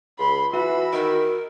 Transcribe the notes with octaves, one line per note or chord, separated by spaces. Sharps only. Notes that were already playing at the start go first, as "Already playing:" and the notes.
C#2 B5 C6
E3 F#4 B5 E6
D#3 A#4